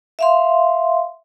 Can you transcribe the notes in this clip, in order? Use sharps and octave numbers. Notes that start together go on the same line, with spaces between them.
E5 F5 C6